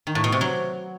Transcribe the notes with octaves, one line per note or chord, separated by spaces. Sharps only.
D#3
A2
B2
C3
F#3